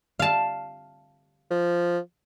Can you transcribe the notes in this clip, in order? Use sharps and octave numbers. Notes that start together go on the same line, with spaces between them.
F5 A5
F3